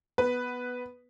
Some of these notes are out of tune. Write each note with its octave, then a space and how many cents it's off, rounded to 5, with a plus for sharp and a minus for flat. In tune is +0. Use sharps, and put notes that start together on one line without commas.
B3 +0 B4 +0